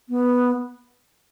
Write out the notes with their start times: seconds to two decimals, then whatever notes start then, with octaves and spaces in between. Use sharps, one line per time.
0.09 B3